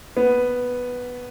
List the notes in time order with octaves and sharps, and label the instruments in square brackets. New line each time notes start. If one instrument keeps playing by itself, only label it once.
[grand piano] B3